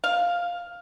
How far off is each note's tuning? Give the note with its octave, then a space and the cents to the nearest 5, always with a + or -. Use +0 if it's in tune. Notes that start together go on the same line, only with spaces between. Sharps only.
F5 +5